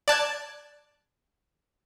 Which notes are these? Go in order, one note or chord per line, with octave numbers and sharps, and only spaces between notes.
D5 A5 F#6 G#6